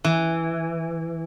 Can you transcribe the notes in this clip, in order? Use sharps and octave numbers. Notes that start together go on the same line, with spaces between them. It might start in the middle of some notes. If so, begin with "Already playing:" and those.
E3